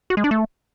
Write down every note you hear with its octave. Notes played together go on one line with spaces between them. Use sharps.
F#4
G#3
D4
A3